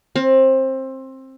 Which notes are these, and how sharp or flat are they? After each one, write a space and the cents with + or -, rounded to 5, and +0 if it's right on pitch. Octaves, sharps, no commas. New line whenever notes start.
C4 +20